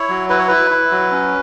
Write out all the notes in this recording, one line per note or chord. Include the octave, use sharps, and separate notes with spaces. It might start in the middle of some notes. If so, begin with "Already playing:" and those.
Already playing: E4 C#5
F#3
E4 B4
C#5
E4 B4
E4
F#3
C#4